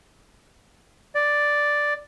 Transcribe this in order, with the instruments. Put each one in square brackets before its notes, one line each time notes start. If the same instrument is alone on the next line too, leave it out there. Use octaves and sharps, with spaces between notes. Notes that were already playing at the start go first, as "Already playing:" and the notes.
[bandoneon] D5